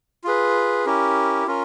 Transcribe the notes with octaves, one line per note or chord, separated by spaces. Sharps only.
F4 G#4 B4
C#4 E4 G4 A#4
C#4 F4 A#4